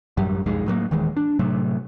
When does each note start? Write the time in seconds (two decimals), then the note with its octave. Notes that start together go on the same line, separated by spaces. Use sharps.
0.17 A1 F#2 F#3 G3
0.46 B1 F2 G#2 G#3
0.66 A2 F#3 G#3 A#3
0.91 D#1 D#3 E3 G#3
1.17 D4
1.39 A2 C3 F#3 A3